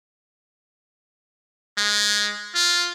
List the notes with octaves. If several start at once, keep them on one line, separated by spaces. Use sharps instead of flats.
G#3
F4